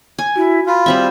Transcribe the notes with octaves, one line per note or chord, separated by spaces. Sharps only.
G#5
E4 F#4
F4 B5
G3 C4 E5